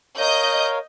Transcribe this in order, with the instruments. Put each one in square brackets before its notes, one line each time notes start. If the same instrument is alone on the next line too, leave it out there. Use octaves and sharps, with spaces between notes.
[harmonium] A#4 C#5 F5 [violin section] D#5 G6